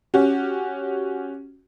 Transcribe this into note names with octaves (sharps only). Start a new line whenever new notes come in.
C#4 F#4 G4